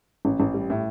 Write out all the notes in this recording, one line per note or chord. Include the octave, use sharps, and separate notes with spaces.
A1
A1
G3
A2